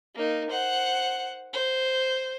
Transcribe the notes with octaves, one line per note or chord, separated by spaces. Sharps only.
A#3 D#4
C5 F#5
C5